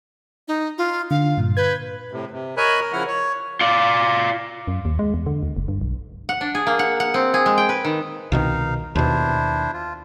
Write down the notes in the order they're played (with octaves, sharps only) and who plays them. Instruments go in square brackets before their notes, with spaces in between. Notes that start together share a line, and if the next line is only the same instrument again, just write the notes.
[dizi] D#4
F4
[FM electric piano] D3 [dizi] F5
[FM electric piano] G2 A#2
[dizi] B4 [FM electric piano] G6 G#6
[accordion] A2 C3
C3
A#4 C#5 D#5 G#5 B5 F#6
A#4
C#3 F3 E4 F#5 F6
C#5
[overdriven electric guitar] F4 D5
[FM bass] F#2
D#2
G#3
E2
D3
D2
F#1
G2
B1
[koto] F#5
D4
G#4
A#3
F#5
F#5
C4
G#4
G#3
G5
B4
D#3
[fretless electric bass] C2 B2 D#3 [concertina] D#4 F5
[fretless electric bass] D#2 B2 [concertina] D4 E4 C5
[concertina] F4